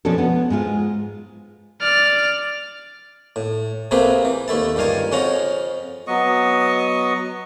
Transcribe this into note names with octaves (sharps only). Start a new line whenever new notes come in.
B2 F3 B3 C#4 D4 A4
B3
G#2 G#3 F4
D5 F6
A2
C3 A3 A#3 C4 G#4 B4
E3
D#2 A3 E4 A5
C#2 G2 D#3 F5 G#5 A5
F2 C#3 C#4 F4 F#5 A#5
F#3 B3 D#5 C#6